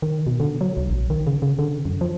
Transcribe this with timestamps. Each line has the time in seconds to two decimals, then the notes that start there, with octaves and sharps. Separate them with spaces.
0.02 D#3
0.27 B2
0.40 D3
0.61 F#3
0.77 C2
0.90 A#1
1.10 D#3
1.27 C#3
1.42 C#3
1.59 D3
1.85 F#2
2.01 F3